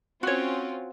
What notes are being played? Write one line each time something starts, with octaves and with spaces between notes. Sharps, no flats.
C4 C#4 F4 F#4 C#5